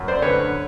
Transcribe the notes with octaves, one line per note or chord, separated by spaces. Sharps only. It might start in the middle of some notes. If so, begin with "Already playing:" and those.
Already playing: F#2
C5 D5
D3 B4 C#5